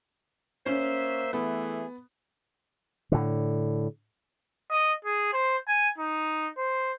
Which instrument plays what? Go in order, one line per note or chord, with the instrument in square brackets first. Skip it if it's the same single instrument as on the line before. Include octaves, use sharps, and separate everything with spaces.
[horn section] A#3 C5 E5 [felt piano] C#4
[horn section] E3 A3 G#4 [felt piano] B3
[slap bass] A2 D3
[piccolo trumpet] D#5
G#4
C5
G#5
D#4
C5